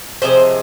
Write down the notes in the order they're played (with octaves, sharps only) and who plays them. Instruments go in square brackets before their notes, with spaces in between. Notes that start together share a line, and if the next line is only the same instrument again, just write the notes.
[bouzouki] C3 F3 G#3 C5